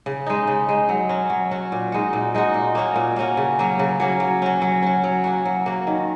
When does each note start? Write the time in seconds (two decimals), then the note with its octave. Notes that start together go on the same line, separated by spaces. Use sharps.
0.06 C#3
0.26 G#3 D#4
0.47 C#3
0.69 G#3 D#4
0.89 F#3
1.09 C#4 F#4
1.30 F#3
1.51 C#4 F#4
1.72 A#2
1.92 G#3 D#4 F#4
2.13 A#2
2.34 G#3 D#4 F#4
2.54 A#2
2.75 A#3 C#4 F#4
2.96 A#2
3.16 A#3 C#4 F#4
3.37 C#3
3.59 F#3 A#3 C#4
3.79 C#3
4.00 F#3 A#3 C#4
4.20 F#3
4.42 C#4 F#4
4.62 F#3
4.83 C#4 F#4
5.04 F#3
5.24 A#3 C#4 F#4
5.45 F#3
5.66 A#3 C#4 F#4
5.87 D#3